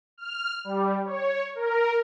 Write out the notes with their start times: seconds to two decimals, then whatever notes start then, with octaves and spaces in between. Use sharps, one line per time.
0.18 F6
0.64 G3
1.05 C#5
1.55 A#4